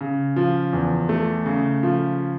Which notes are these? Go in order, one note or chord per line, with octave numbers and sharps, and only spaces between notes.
C#3
F3
E2
A3
C#3
F3